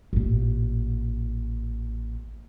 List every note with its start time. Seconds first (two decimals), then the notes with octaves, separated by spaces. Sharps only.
0.13 A1 A#2